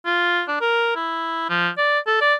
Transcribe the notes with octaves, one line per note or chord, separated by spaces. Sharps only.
F4
D4
A#4
E4
F3
D5
A4
D5